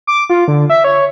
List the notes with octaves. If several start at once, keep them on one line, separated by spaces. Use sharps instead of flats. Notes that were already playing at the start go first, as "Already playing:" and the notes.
D6
F4
D3
E5
C#5